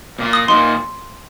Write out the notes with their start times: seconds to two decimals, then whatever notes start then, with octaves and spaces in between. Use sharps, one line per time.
0.19 A#2 A#3 F4
0.33 D#6
0.48 A#2 A#3 D#4 C6